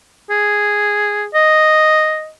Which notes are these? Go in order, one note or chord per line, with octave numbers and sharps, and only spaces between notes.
G#4
D#5